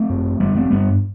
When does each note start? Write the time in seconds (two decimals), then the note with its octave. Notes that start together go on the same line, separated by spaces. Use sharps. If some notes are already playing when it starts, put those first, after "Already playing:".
Already playing: A3 C4
0.10 F#2
0.40 F#2 G3 B3
0.56 A3 C4
0.71 G2 G3 B3